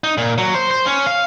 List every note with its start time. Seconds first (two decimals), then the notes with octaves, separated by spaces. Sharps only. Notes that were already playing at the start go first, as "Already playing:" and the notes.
0.04 D#4
0.18 A#2
0.38 F#3
0.54 C5
0.71 C5
0.86 C#4
1.06 F5